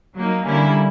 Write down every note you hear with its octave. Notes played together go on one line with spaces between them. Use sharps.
F#3 A#3 D#4
D3 G3 A#3 C#4 E4